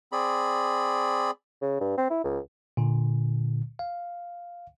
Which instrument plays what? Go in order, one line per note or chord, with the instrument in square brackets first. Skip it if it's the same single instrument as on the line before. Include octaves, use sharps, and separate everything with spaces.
[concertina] C4 G#4 D5 B5
[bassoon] C#3
G2
C4
E4
C#2
[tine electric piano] A#2 D3
F5